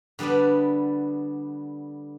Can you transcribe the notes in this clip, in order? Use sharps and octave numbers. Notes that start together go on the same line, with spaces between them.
D3 G3 B3 B4 D5